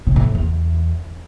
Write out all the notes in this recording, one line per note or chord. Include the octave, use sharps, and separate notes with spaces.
C3
A2
F2
E2